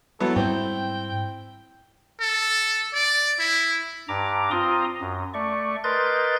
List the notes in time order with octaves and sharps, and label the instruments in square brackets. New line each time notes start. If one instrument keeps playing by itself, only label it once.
[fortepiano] F#3 B3 E4 [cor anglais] A4
[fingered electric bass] G#2 G3 G#3 [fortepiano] C4 E4 [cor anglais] G5
[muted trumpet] A4
D5
E4
[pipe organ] G2 A#5 D6
C4 F4 A#5 C6 D#6
F#2
A3 D5 C#6
A#4 B4 D#5 C6 G6 A6